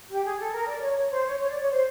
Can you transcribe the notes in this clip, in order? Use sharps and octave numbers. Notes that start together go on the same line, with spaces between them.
G4
G#4
A4
A#4
D5
C#5
C#5
C5
C#5
C#5
D5
C#5
C5